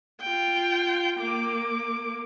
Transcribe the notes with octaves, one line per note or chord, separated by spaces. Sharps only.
F4 G5
A#3 D6